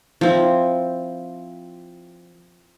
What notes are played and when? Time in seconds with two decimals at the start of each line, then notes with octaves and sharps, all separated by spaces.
0.21 F3 C4 E4